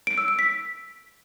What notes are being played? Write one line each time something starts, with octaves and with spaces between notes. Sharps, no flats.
D7
E6
D7
B6